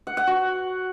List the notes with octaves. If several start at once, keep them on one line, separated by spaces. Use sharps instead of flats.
F#5
F#5
F#4